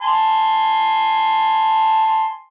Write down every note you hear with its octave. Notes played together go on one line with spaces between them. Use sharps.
G#5 A5 C6